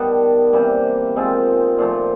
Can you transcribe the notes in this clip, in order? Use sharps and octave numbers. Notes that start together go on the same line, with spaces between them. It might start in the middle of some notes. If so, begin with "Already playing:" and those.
Already playing: D#3 G3 B3 D4
C3 E3 G3 A#3
D#3 G#3 C4 F4
A#2 F3 A3